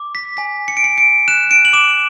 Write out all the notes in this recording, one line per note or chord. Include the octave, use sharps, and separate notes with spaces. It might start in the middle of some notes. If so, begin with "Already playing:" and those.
Already playing: D6
B6
G#5 B6
C#7
D7
G#5 C#7
D7
F#6 E7
D7
F#7
D6 E7